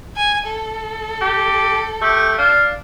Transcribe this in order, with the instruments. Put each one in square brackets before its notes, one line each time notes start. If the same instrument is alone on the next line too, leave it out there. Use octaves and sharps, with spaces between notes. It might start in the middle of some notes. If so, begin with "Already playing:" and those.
[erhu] G#5
A4
[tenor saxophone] G4
[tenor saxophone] A3 [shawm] G4
[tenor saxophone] D4 [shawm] F5